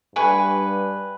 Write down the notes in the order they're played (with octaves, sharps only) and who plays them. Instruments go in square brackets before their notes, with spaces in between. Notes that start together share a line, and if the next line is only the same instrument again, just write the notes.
[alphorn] G2 [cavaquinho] B4 G#5 C#6